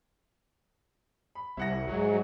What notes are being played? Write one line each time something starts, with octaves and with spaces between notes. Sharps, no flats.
B5
C2 E4 F#5 A#6
G#2 F#3